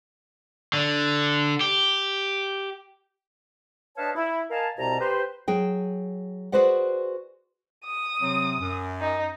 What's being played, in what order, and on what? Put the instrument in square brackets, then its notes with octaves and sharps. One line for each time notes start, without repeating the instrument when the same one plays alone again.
[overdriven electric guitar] D3
G4
[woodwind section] D4 B4 C#5 D#5 F5 A5
E4
A#4 D#5 F5 G#5 A5
C2 B2 C4 A5 A#5
G4 B4 C5
[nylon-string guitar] F#3 G#4 G5
F#4 G#4 B4 C5 D5 F#5
[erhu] D#6
[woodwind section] C3 F#3 C4
F#2
[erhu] D#4